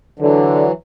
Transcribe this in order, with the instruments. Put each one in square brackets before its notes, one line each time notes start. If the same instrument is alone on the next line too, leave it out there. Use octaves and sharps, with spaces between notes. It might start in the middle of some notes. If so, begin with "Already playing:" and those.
[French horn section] D3 [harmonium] E3 F#3